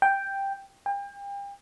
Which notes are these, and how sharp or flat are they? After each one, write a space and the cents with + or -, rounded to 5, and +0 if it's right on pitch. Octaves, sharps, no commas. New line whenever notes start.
G5 +5
G5 +35